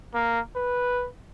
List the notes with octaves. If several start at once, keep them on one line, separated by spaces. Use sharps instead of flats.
A#3
B4